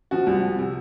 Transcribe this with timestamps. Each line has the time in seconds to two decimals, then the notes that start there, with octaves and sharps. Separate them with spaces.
0.11 F3 F#4
0.27 C2
0.42 C2
0.59 C3